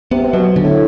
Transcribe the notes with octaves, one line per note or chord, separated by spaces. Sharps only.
C3 B3
C3
B2 F#3
D3
A2